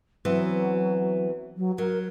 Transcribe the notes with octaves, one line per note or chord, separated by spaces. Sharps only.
E3 F#3 B3 C4
F#3
F#3 A#4